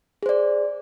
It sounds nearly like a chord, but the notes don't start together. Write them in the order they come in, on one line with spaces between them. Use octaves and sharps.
G#4 C5 D5